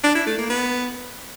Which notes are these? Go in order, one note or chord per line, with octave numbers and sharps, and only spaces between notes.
D4
E4
A3
A#3
B3